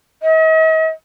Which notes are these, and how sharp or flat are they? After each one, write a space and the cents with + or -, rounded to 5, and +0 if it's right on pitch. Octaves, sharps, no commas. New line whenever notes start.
D#5 +45